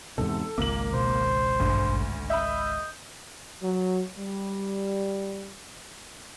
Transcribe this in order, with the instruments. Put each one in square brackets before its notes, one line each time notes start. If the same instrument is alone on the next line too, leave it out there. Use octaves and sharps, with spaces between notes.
[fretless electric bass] E2 G#2 C3 [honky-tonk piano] A4
[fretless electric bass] G#1 C#2 [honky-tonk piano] A#3 F#7
[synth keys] B2 [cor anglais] C5
[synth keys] A1 G2 B2 [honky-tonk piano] D2
[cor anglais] D#5 [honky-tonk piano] E5 B5 [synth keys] G6
[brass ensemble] F#3
G3